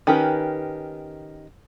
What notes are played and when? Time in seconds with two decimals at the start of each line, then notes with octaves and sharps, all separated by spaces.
0.07 D#3 C#4 G4 A#4 B4